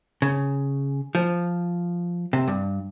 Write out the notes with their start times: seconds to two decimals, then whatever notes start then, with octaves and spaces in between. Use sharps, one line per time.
0.22 C#3
1.15 F3
2.33 C3
2.48 G2